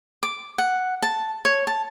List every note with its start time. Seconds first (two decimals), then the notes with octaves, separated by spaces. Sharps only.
0.23 D6
0.58 F#5
1.02 A5
1.45 C#5
1.67 A5